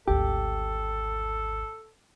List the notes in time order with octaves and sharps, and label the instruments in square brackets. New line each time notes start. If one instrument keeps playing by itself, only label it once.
[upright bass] G#1 D2 [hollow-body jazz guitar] G4 [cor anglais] A4